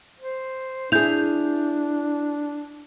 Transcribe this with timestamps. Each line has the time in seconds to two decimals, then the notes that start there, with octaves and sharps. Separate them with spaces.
0.20 C5
0.92 D4 E4 G#4 G6 F7